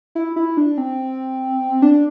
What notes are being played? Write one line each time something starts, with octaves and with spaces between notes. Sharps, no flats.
E4
E4
D4
C4
D4